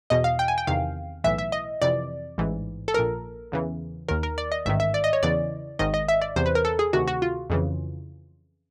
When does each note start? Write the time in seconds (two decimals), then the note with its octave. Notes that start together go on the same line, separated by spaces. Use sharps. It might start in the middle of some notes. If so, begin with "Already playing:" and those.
0.10 E2 B2 D#5
0.24 F5
0.39 G5
0.48 G#5
0.58 G5
0.67 E2 C3 D#3 F5
1.24 B1 A2 E3 E5
1.38 E5
1.52 D#5
1.82 F2 C3 E3 D5
2.38 A1 G#2 E3
2.88 A4
2.94 A#1 A#2 A#4
3.52 E2 C#3 E3
4.09 D#2 D#3 A#4
4.23 A#4
4.38 D5
4.52 D#5
4.65 A1 G#2 D#3 E5
4.80 E5
4.94 D5
5.04 D#5
5.13 C#5
5.23 E2 C#3 E3 D5
5.79 G#1 G#2 D#3 D#5
5.94 D#5
6.08 E5
6.22 D5
6.36 E2 C3 E3 C5
6.46 B4
6.55 A#4
6.65 A4
6.79 G#4
6.93 D2 C3 D#3 F#4
7.08 F#4
7.22 F4
7.50 F2 C#3 E3